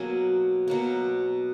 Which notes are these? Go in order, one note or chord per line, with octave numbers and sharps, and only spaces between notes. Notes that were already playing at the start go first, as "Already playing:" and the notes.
Already playing: B2 F#3 A#3 G#5
B2 F#3 A#3